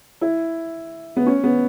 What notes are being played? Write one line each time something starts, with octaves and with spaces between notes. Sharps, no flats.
E4
B3
C#4
B3